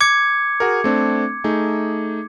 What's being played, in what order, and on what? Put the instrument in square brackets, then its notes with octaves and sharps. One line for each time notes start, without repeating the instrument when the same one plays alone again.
[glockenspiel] D6 G#6 C#7
[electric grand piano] F#4 G#4 A#4
A3 C4 D4
A3 D#4 G#4